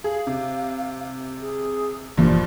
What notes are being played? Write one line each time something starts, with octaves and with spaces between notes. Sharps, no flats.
G#4 F5
C3
G#4
F1 G2 A#2 E3 F3 A#3